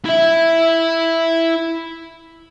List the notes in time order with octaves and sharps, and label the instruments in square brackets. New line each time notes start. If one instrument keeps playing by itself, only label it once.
[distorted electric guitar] E4 E5